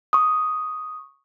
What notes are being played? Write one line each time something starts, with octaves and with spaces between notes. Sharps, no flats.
C#6 D#6